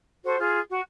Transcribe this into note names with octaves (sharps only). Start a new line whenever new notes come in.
F#4 A4 C5
F4 G#4
F#4